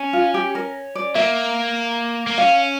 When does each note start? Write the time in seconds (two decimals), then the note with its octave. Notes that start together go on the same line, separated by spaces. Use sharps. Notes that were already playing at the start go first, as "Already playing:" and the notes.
Already playing: C#4
0.13 F4
0.34 G4
0.55 A#4
0.95 D5
1.15 A#3 E5
2.27 A#3
2.38 C#4 F5